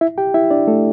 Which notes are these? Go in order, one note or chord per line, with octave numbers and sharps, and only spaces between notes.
E4 E5
G4 G5
E4 E5
D4 D5
A3 A4